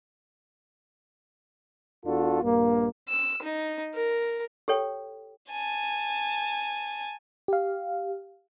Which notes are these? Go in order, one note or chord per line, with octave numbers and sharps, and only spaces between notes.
E2 D4 F4 F#4 A4
A#1 G2 A#3
E6
D#4
A#4
G4 A4 C#5 G5
G#5 A5
G4 F5